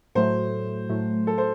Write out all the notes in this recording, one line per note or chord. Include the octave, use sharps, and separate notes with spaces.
A2 F#3 A3 C5
A2 F#3 A3
A4
C5